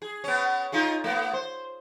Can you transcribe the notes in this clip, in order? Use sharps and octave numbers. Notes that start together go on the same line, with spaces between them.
G#4
B3 C#4
D#4 F4 G#4
A3 B3
C5